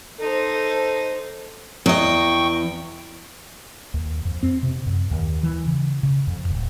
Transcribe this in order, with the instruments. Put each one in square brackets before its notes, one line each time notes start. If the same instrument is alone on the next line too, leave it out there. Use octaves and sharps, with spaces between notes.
[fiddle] D#4 C5 [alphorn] A4
[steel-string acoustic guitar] E2 D#5 [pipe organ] G5 C#6
[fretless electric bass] D#2
F2
C4
C3
F#2
D#2
E3
C#3
C#3
F2
D1